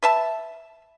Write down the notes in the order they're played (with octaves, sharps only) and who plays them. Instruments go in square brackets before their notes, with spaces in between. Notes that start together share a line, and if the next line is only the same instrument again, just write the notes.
[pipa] B4 E5 A5